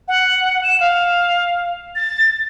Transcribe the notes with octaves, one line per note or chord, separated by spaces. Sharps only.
F#5
E7
F5
A6